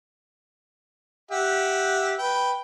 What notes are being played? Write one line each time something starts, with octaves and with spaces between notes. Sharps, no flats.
G4 E5 F#5
B4 G5